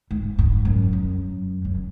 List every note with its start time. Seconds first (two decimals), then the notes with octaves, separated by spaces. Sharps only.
0.11 G#2
0.39 G#2
0.65 F#2
0.93 F#2
1.65 F#2